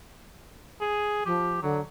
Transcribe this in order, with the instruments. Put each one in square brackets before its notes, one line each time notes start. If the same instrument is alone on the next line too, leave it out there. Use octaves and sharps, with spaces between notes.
[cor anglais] G#4
[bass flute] F3 [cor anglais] G4
[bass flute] D3 [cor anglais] F#3